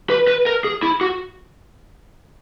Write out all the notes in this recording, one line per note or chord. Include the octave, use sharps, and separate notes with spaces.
B4
B4
A#4
G#4
E4
F#4